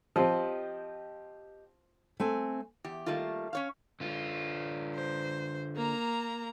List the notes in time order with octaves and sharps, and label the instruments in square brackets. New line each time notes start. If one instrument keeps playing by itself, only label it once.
[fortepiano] F3 C4 [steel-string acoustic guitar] G4 D#5
[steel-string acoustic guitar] A3 C4 G#5
[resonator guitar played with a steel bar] E2 G4
D#3 G3 A3 A#3 F4
C#4 C#5 F5
[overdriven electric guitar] D3 F4
[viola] C5
A#3 A#5